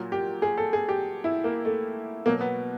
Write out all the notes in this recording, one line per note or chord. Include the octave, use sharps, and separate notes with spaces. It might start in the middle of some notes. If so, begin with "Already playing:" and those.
Already playing: A#2 F#3
G4
G#4
A4
G#4
G4
E4
A#3
A3
B2 F#3 A#3
B3